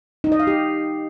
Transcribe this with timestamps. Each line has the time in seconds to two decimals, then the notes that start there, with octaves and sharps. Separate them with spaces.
0.24 D#4
0.32 D#5
0.39 F5
0.47 G4